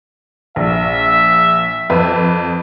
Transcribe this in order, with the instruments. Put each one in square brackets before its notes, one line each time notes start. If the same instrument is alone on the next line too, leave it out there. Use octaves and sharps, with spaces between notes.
[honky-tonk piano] A#1 [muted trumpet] E5
[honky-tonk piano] F2 B4 B5